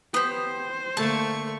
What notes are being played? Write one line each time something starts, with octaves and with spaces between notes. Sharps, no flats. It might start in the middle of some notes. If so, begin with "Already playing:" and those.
B3 G4 C5
D3 A3 A#3 A5 C#6